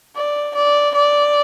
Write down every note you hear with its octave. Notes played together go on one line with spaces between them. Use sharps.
D5
D5
D5